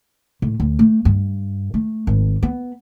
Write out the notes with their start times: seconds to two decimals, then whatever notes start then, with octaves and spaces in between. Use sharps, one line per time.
0.42 A2
0.60 D2
0.79 A3
1.05 G2
1.74 A3
2.07 G#1
2.43 B3